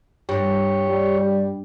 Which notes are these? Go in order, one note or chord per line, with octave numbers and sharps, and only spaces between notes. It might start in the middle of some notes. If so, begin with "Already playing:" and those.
G2 G4 C#5
G3